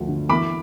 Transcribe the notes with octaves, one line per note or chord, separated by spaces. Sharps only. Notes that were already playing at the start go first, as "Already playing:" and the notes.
Already playing: D2 F3
D3
E3 B5 D6